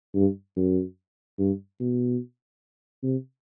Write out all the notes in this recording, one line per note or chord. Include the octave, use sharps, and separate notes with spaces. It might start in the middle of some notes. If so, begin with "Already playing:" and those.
G2
F#2
G2
B2
C3